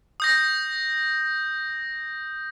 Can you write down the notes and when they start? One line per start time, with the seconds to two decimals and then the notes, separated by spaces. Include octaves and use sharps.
0.20 D#6 G6 A#6